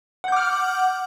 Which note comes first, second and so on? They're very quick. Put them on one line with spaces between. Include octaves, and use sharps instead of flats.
F#5 G6 D6 F6